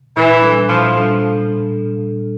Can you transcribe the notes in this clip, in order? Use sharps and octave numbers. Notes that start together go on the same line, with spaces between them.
A#2 E3
G3 D4 A4
A#2 F3
G3 D4 A4